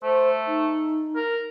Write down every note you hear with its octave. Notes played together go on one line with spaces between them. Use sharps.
A3 C5
D#4
A#4